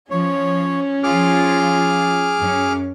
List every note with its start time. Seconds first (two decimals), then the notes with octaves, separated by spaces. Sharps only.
0.11 F3 C#4 C#5
1.03 F3 F4 G#4 D6 F6
2.40 F#2 C#4